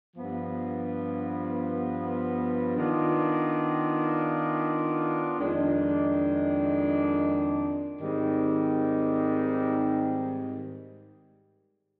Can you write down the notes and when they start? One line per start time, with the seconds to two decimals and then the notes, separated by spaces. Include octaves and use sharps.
0.16 G2 F3 B3
2.77 D#3 B3 D4 F4
5.37 F2 D#3 G#3 D4
7.99 G#2 D#3 G3 C4 G4